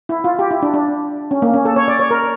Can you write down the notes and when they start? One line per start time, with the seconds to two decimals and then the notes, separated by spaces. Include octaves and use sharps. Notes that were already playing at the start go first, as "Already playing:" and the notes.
0.09 E4
0.24 F4
0.39 G4
0.51 E4
0.62 D4
0.74 D4
1.31 C#4
1.42 A#3
1.54 C#4
1.65 A4
1.76 C#5
1.88 D5
2.00 C#5
2.11 A#4